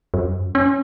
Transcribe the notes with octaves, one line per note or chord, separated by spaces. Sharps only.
F#2
C#4